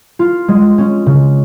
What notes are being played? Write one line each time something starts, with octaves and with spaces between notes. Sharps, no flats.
F4
G#3
C#4
C#3